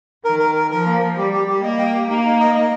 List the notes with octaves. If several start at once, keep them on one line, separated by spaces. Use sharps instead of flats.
D#3 A#4
A#4
A#4
F3 A#4
A#3
A#3
G3 G4
G4
G4
A#3 D#5
G5
G4
A#3 D#4
D#4
D#5
D#5